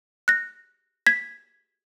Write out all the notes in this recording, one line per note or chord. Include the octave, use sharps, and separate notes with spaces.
F#6 A#6
G#6 B6